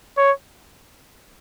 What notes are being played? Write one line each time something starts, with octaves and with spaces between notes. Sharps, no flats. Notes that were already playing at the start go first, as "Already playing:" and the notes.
C#5